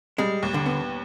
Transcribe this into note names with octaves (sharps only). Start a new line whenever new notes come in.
G3 G#3
D#2
D3
B3